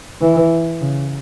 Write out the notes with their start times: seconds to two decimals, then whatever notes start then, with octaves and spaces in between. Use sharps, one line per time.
0.21 E3
0.81 C#3